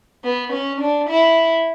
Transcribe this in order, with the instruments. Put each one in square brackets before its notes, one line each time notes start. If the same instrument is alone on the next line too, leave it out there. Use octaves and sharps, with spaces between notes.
[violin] B3
C#4
D4
E4